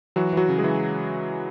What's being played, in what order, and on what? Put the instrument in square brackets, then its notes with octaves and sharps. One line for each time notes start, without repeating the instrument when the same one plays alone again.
[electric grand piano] E3 F#3 F#4
E3 F#3 F#4
C#3
G#3 G#4
E3